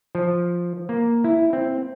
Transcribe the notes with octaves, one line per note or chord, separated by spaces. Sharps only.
F3
A#3
E4
C4